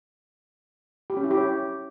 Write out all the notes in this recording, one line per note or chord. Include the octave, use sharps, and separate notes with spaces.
G4
C#4
E4
G4
C#5